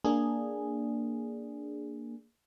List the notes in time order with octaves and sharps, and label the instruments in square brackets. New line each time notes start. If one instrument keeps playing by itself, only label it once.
[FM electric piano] A#3 D4 G#4